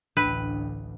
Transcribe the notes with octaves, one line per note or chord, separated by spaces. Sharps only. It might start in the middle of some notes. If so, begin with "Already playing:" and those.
A1 D2 D4 B4